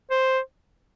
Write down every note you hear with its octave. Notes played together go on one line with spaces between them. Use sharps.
C5